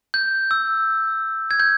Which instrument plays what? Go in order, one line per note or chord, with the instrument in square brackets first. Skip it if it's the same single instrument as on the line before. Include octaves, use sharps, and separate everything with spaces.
[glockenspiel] G6
E6
G#6
G6